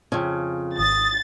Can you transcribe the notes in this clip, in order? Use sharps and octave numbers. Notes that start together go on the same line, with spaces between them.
F2 C#3 G#6
G#1 D#6 A6